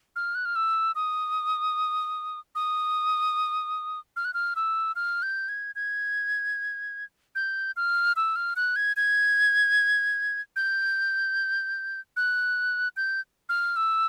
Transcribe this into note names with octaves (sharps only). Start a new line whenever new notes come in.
F6
F#6
F6
E6
D#6
D#6
F6
F#6
F6
E6
F6
G6
G#6
G#6
G6
F6
E6
F6
F#6
G#6
G#6
G6
F#6
G6
F6
E6